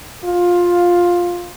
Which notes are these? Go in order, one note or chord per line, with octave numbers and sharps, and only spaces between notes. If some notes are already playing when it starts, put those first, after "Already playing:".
F4